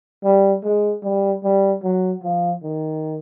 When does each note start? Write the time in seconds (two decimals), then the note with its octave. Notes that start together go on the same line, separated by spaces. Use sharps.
0.24 G3
0.64 G#3
1.03 G3
1.44 G3
1.84 F#3
2.23 F3
2.63 D#3